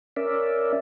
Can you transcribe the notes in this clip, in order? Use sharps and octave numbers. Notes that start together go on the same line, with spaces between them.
C#4 A#4 D5 E5